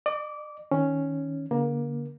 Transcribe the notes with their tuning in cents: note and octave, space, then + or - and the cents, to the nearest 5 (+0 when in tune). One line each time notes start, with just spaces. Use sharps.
D5 +45 D6 -20
D#3 +15 C#4 +0
D3 -45 A#3 +25